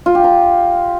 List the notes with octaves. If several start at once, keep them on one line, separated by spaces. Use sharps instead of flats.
F4
G4
A#5